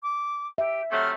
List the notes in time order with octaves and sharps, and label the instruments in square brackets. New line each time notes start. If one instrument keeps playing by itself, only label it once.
[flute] D6
[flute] G4 [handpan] E5
[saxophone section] C3 F#3 A3 [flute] F6